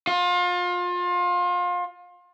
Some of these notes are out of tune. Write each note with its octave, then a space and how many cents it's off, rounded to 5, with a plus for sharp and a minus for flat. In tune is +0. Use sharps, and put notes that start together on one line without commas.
F4 +30